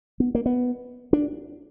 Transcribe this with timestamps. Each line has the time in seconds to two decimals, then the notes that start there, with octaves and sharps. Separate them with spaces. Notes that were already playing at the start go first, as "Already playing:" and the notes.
0.20 B3
0.35 A#3
0.46 B3
1.13 D4